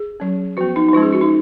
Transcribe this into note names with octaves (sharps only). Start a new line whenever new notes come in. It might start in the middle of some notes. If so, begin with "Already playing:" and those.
Already playing: G#4
F#3 C#4
F3 B3 F#4
D#4
D#4
F3 G#3 C#4 F4
G#4
F#4
D#4